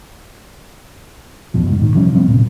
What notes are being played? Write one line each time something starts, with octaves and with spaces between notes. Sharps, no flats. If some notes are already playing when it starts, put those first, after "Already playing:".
A1 E2 B2 F3
F#1 G#2
A#2 D#3
C3 F3 G3 C#4
F3 G3 B3 C4
F1 A#2 C#3